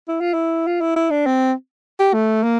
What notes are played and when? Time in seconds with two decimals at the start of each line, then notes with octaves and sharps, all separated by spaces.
0.08 E4
0.20 F4
0.33 E4
0.67 F4
0.81 E4
0.96 E4
1.10 D4
1.26 C4
1.99 G4
2.13 A3
2.43 A#3